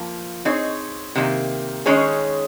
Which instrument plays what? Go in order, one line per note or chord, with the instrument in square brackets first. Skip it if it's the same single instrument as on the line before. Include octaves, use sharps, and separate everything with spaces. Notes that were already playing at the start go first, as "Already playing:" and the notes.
Already playing: [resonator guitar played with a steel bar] F3 A#3
C4 D#4 G#4 C#5
C3 D#3 A#3
D#3 G#3 C#4 G#4 C#5